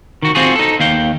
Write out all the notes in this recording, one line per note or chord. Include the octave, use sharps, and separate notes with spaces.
D#3 F#4
C4 F4 F#4 G#4
D#4 A4
D#2 F5 G5